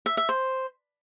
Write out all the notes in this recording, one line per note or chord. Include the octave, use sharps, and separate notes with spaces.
E5
E5
C5